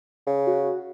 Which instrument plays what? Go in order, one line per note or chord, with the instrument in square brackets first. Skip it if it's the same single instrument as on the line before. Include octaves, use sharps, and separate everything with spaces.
[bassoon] C#3
[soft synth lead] F#4